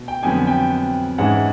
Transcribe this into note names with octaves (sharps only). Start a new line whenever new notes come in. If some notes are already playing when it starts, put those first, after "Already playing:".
Already playing: B2
G5
F2 D3 F#3 B3 G#5
G5
G#2 E3 G#3 C#4 F#5